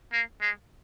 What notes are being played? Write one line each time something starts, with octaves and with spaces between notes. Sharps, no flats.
A#3
G#3